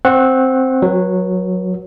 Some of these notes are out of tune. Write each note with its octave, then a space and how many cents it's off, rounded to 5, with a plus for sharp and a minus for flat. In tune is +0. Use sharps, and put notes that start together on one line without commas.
C4 +0 F#5 +0 C#6 -40
F#3 -10 B4 -40